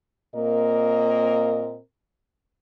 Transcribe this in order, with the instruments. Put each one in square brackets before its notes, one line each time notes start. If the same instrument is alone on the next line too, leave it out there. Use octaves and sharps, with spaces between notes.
[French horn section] A#2 A#3 C4 A#4 D#5